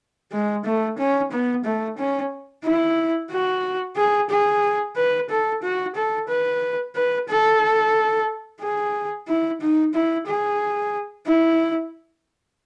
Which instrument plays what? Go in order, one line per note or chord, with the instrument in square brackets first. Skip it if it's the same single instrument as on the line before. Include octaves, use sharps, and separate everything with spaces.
[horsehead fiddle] G#3
A3
C#4
B3
A3
C#4
E4
F#4
G#4
G#4
B4
A4
F#4
A4
B4
B4
A4
G#4
E4
D#4
E4
G#4
E4